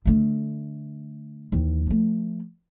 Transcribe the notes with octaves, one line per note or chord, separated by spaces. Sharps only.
D3 A3
D#2 E3
F3 A3